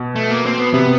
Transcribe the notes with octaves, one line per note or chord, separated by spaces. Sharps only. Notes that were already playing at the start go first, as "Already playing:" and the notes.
Already playing: B2
A3
A#3
C4
B3
C3 B3